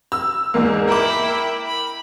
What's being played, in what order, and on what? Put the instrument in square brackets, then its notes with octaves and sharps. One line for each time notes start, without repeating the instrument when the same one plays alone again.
[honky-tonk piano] E6
E2 G#2 A#3
[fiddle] E4 G5 [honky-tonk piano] A#4 D6
[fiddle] B5